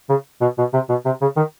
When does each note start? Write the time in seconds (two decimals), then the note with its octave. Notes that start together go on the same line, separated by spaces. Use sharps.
0.09 C#3
0.41 B2
0.58 B2
0.73 C3
0.89 B2
1.05 C3
1.21 C#3
1.37 D#3